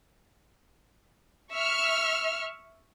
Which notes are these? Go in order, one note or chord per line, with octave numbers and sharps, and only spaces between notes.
E5 C#6 E6 F6